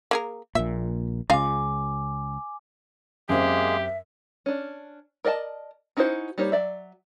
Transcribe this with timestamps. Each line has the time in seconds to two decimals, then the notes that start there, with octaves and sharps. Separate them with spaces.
0.11 A#3 G#4 A#4
0.55 A#1 A#2 E5
1.30 C#2 C#3 F4 D#5 F5 G#5 D6
3.29 F#2 G#3 A#3 C4 G4 G#4 E5
4.46 C#4 D4
5.25 A#4 D5 D#5 G5 A5
5.97 C#4 D#4 E4 F#4 C5
6.38 G3 A#3 D#4 C5 C#5
6.52 F#3 D5 E5